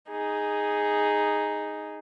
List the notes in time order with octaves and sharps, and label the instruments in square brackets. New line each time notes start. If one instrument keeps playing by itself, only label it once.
[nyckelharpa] D#4 G#4